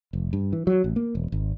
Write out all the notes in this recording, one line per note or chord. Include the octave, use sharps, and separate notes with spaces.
F1
G2
E3
F#3
A1
A#3
E1
G#1